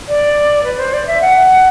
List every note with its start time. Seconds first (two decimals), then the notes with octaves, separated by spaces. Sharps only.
0.09 D5
0.64 B4
0.79 C5
0.93 D5
1.07 E5
1.21 F#5